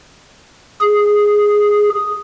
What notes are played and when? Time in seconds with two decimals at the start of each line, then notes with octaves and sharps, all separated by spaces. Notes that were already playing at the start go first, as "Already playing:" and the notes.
0.80 G#4